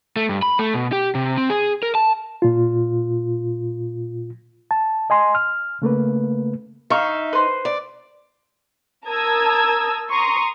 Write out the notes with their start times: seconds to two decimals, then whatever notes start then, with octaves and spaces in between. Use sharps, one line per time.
0.16 A3
0.29 G2
0.42 B5
0.59 A3
0.74 B2
0.92 G4
1.15 C3
1.38 C4
1.50 G#4
1.83 A#4
1.95 A5
2.42 A#2 F4
4.71 A5
5.10 D#5 G#5 C6
5.35 F6
5.82 C#3 A3 A#3 B4
6.90 D#4 E5 F5 C#6
7.33 B4 C5
7.65 D5
9.06 A#4 A5 A#5 D#6 E6 G#6
10.09 A#5 C6 C#6 D#6